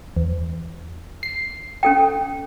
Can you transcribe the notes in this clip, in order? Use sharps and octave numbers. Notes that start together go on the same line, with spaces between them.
E2
C7
C#4 A4 G5